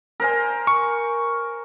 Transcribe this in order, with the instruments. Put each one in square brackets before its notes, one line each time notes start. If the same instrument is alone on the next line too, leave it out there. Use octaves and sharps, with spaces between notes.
[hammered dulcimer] A#4 C5 G#5
[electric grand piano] C#6